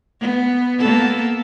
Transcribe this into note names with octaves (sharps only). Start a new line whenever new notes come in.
B3
A#3 B3 A4